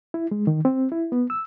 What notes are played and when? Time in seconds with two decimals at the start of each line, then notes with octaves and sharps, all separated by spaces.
0.14 E4
0.31 G#3
0.47 D#3
0.65 C4
0.92 E4
1.12 B3
1.30 E6